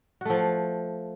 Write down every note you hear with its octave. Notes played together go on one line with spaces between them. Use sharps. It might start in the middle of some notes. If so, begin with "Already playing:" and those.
F3 A3 F#4